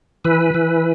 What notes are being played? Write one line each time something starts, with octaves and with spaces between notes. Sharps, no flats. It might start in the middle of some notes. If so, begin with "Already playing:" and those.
E3 B4
E3